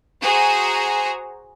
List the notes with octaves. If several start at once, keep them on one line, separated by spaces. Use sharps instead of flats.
F#4 G#4 C5 A#5